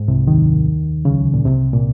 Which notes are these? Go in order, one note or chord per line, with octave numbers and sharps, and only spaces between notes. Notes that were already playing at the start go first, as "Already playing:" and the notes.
Already playing: G#2
C2 C3
D#2 D#3
C#2 C#3
A#2
C2 C3
A#2